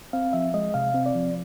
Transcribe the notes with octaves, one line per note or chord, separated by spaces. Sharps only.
C4 F5
F3 E5
G#3 D#5
C3 F5
C4
D5
F3